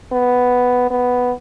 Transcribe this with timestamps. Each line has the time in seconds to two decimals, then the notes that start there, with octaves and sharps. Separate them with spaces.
0.12 B3
0.91 B3